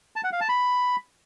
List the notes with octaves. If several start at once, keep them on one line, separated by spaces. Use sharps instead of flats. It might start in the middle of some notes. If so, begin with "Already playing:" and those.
A5
F#5
F5
A5
B5